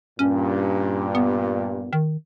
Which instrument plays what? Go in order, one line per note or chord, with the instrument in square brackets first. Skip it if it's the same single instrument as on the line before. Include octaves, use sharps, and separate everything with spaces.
[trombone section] G2 A#2 [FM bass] C#4
[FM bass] B3
D#3